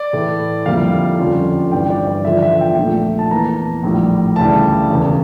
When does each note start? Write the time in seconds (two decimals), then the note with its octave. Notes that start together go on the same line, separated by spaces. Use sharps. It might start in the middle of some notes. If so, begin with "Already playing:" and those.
Already playing: D5
0.13 A2 E3 A3
0.66 F2 D3 G3 A#3 E4 F5
1.19 F2 D3 G3 C#4 F4
1.72 G1 G2 E3 G3 G5
1.90 D5
2.07 D5
2.25 E2 D3 F3 E5
2.42 E5
2.61 G5
2.78 A#1 A#2 F3 A3
3.19 A5
3.31 E2 E3 A#3 A#5
3.83 A#1 A2 G3
4.36 D2 C#3 E3 G3 A5
4.90 E1 E2 C#3